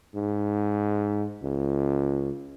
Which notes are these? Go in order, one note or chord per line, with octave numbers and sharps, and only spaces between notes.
G#2
C#2